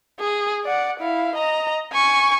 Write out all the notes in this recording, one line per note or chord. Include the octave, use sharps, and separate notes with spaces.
G#4
D5 F#5
E4 F5
D#5 A#5
G#5 C#6